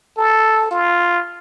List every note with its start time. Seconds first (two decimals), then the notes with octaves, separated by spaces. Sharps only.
0.18 A4
0.71 F4